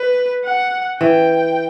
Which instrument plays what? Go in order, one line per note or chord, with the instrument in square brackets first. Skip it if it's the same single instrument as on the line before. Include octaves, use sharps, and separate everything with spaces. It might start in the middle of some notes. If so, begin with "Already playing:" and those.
Already playing: [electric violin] B4
F#5
[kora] E3 [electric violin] G5